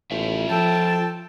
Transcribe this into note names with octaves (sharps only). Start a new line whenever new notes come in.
A1 F4 C#5 E5
F3 A4 G5 A5